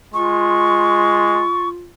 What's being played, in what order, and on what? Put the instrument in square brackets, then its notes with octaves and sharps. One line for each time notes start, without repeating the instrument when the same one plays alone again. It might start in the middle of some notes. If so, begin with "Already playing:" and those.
[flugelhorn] G#3 [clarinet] F4 [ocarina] C#6